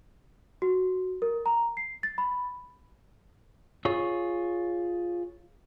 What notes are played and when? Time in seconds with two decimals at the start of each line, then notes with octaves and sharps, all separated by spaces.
0.62 F#4
1.22 A#4
1.46 A#5
1.77 C7
2.03 A6
2.18 B5
3.85 F4 G#4 C#5